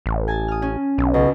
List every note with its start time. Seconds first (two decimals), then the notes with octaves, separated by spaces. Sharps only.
0.06 A1
0.28 G#5 A5 A6
0.48 D#6 F6
0.62 C#4
0.98 B1
1.14 C#2 B2